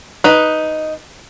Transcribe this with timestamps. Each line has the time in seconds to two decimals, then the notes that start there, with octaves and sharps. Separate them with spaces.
0.24 D#4 B4